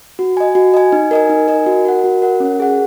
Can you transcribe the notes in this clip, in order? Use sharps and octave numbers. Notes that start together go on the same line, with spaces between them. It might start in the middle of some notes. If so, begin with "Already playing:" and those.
F#4
D#5 G#5
F#4
D#5 G#5
D#4
A#4 D#5 G#5
D#4
A#4 D#5 G#5
F#4
A#4 F#5
F#4
A#4 F#5
C#4
G#4 F#5